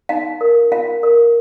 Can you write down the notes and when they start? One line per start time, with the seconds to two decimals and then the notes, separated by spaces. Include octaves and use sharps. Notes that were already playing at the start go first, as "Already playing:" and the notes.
0.09 D#4 F5
0.41 A#4
0.72 F4 F5
1.03 A#4